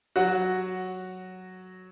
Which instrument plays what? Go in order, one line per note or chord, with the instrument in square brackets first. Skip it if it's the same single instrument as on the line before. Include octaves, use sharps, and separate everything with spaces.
[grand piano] F#3 F#4